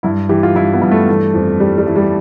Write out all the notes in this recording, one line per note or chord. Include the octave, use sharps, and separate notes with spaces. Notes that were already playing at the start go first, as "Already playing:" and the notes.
G2 E4
E3 G4
F4
G2 E4
B3
G2
A3
E3 A3
F2
E3 G3
G3
E3
G3